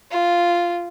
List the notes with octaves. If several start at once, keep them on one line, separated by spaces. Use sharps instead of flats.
F4